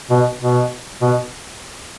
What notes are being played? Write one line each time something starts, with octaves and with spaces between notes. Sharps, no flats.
B2
B2
B2